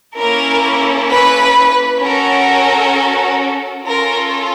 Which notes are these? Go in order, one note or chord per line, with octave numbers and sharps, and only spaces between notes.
A#3 C#4 E4 A4 A#4
B4
C#4 F#4 A4 A#4
C#4 F4 A4 A#4